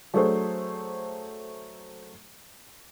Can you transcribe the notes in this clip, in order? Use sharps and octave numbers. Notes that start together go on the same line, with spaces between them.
F#3 A3 D4 G#4 A4 C5